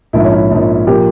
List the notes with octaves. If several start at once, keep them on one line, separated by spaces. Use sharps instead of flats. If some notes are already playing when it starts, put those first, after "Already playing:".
A#1 G#2 F3 E4
C#4
E4
A#1 G#2 F3
A#2 F3 G4